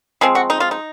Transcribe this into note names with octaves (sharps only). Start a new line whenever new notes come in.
F3 G#3 C4 G#4
F#4
D#4
F4
D#4